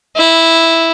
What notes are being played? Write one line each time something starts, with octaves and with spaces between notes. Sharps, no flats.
E4